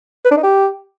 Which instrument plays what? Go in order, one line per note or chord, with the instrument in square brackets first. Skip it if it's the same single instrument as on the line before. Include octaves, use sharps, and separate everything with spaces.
[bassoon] B4
D4
D#4
G4